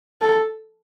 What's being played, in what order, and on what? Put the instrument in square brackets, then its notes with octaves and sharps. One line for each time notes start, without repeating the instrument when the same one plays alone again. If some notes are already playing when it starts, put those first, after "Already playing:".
[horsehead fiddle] A4